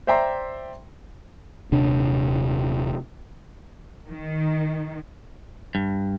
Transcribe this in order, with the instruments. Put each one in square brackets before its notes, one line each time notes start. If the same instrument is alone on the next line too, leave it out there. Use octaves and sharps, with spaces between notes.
[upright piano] C5 D5 E5 G5 A#5 C6
[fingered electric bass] D#1 C3 D4
[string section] D#3
[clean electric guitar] G2